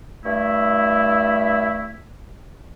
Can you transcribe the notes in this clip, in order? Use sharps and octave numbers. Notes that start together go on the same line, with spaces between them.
G2 A3 E4